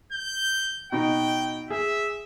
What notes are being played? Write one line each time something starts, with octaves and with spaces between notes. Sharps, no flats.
G6
B2 D#4 G5
G#4 E5